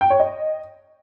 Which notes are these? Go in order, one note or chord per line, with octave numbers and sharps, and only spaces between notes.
G5
C#5
D#5